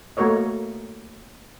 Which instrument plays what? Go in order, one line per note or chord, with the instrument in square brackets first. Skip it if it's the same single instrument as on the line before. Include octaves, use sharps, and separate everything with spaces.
[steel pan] A3 A#3 F#4 A#4 C#5 D#5